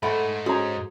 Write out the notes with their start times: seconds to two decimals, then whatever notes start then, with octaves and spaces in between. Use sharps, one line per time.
0.03 G#2 A3 F#5 B5
0.46 C#4 F#4 G#4 C5 A#5